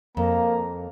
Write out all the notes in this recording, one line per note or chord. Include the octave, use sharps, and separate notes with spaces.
F2 A#3 A#5